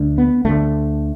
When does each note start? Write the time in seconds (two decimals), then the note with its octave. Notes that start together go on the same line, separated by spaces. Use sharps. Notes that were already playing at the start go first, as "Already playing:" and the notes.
Already playing: D2 D3
0.18 B3
0.45 D2 D3 A3